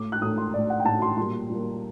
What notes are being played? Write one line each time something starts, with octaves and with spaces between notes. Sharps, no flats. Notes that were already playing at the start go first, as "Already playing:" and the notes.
Already playing: A2 A3 D6
F#6
A2 A3 D#6
C6
A2 A3 D5
F#5
G5
A2 A3 A5
C6
A#2 G3 A#3 C6
A#2 G3 A#3